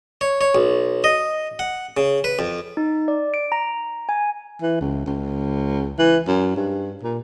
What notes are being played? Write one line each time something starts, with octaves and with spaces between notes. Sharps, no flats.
C#5
C#5
B1
D#5
F#5
C#3
B4
F2
D#4
D5
D7
A#5
G#5
E3
C#2
C#2
E3
F#2
G2
A#2